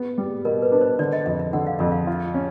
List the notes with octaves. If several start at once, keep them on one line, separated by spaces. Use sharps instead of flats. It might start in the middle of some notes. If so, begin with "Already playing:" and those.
Already playing: B3
G3
B2 A#4
B4
D4
C5
D3 D5
D#5
F2 E5
E5
D3 F#5
F5
F2 E5
F5
F4
C#4